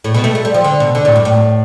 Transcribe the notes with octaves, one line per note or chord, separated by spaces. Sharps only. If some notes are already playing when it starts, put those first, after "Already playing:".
A2
B2
A3
A3
G3
F3
D3
B2
D3
A2
G2
A2